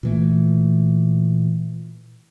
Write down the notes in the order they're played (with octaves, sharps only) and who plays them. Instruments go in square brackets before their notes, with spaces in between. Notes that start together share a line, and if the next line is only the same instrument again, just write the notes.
[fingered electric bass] A#2 E3 A3